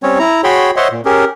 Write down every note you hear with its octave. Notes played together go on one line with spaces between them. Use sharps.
G3 C4 C#4 C#5
E4 A#5
F#4 G#4 C#5 G5 B5 C6
C5 C#5 D#5 E5 F#5 C6
A#2
C#4 G4 G#4 A#4